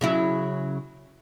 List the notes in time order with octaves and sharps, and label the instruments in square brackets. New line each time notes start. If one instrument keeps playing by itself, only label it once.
[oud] C#3 F#3 E4